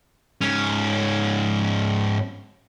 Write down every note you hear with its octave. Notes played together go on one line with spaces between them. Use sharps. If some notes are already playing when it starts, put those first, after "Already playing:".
G#2 C#4